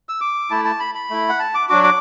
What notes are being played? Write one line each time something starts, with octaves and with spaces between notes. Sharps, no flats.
E6
D6
A3 E4 A5
A5
B5
B5
A3 E4
F#5
A5
D6
F#3 D4 F#4 D6
D6